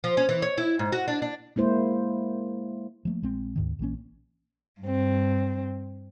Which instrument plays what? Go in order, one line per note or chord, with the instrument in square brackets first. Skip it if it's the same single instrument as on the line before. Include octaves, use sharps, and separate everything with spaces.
[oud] F3
C#4
E3
C#5
E4
G#2
F#4
D4
D4
[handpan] G#3 A#3 E4 C5
[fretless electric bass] F3 A3 A#3
A#1 G#3 C4
D2 G#2 D#3
A#1 E3 A#3 C#4
[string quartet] G2 C4